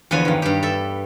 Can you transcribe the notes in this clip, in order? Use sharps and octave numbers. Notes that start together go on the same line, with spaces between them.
E2 D3 F3 B4 C#5 G#5
G2 D#3
G2 G4
A4 E5